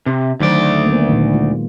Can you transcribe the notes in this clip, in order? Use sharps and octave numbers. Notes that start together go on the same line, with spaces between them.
C3
D2 D#3 F#3 C5 D5
A#3 B3
A#2 D#3
G#3 F4